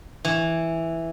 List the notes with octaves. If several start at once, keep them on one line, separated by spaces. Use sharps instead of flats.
E3